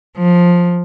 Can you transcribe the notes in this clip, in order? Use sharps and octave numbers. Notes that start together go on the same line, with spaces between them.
F3